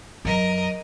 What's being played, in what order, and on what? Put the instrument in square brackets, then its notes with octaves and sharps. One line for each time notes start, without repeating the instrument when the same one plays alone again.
[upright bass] F#2 [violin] A#4 D#5